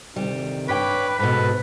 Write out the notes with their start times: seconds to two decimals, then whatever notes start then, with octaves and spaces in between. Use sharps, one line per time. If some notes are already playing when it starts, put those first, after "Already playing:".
0.16 D2 C3 D#3 G3
0.68 G2 B4 C#5 G5 B5 D6
1.19 G#2 B2 B3 A4 B4